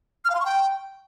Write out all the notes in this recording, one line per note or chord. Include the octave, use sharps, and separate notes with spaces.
F6
F5
C6
C#6
G5